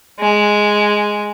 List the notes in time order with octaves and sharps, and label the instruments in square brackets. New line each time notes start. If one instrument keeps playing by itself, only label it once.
[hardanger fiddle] G#3